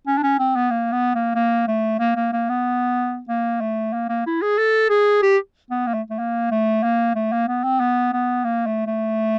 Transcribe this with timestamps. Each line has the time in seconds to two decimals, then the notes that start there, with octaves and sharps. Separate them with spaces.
0.07 C#4
0.18 D4
0.23 C#4
0.39 C4
0.56 B3
0.71 A#3
0.92 B3
1.15 A#3
1.35 A#3
1.68 A3
2.00 A#3
2.16 A#3
2.33 A#3
2.49 B3
3.29 A#3
3.61 A3
3.93 A#3
4.09 A#3
4.26 E4
4.42 G#4
4.58 A4
4.90 G#4
5.23 G4
5.71 B3
5.87 A#3
5.94 A3
6.10 A3
6.19 A#3
6.51 A3
6.83 A#3
7.16 A3
7.32 A#3
7.48 B3
7.64 C4
7.80 B3
8.13 B3
8.44 A#3
8.66 A3
8.87 A3